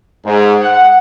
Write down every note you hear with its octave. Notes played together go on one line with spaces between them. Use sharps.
G#2
F#5